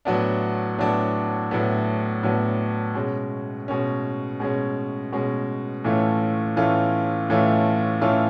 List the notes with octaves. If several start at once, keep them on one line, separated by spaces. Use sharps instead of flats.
A2 F#3 B3 D4
A2 F#3 B3 D4
A2 F#3 B3 D4
A2 F#3 B3 D4
B2 G#3 C#4
B2 G#3 C#4
B2 G#3 C#4
B2 G#3 C#4
A2 E3 A3 C#4 F4
A2 E3 A3 C#4 F4
A2 E3 A3 C#4 F4
A2 E3 A3 C#4 F4